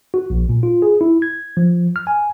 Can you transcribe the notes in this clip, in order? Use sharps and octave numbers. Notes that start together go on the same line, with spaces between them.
F#4
A#1
A#2
F4
G#4
E4
G#6
F3
F6
G#5